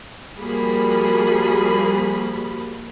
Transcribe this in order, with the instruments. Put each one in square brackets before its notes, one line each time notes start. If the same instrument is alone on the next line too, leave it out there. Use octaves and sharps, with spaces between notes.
[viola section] F3 G3 A#3 F#4 G#4 B5